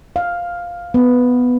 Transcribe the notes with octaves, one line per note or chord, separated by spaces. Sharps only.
F5
B3